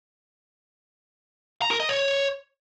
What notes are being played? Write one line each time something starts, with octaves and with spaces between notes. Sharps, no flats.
A#5
A#4
D#5
C#5